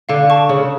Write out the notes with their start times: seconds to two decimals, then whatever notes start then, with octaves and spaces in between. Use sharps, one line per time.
0.09 D3 F5
0.30 A5 C#6
0.49 C#3 C#5